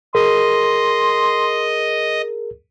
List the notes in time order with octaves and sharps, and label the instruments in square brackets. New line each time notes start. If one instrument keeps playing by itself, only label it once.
[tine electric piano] G#4 A#4 [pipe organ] D#5 [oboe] C6